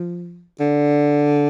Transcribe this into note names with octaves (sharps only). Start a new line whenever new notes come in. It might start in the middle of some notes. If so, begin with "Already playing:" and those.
Already playing: F3
D3